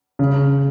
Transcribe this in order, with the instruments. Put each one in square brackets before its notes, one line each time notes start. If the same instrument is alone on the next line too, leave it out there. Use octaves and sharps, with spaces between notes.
[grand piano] C#3